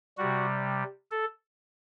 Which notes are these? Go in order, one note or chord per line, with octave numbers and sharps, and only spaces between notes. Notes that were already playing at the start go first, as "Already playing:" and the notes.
C3 G3 F#4
A4